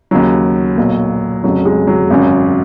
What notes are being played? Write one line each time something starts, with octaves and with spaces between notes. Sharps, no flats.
D#2 C#3 F#3
B1 A#2
F1 F2 C#3 F#3
G#3
F#3
G#1 F#2 C#3